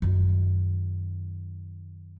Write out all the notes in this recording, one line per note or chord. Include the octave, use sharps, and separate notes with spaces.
F#2 D#3